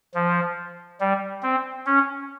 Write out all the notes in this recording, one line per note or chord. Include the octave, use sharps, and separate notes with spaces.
F3
G3
C4
C#4